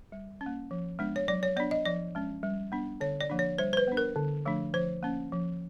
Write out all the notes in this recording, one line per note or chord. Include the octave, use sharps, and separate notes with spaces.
G3
C#4
A#3
F3
G#3 B3 D4
C#5
F#3 D5
C#5
B3 D4 D5
D#5
F3 D5
G#3 C#4
G3
B3 D4
D3 C#5
D5
F3 A#3 D4
C#5
G3 C5
C5
B4
B3 D4
A#4
D3
F3 A3 D4
F3 C5
A#3 C#4
F3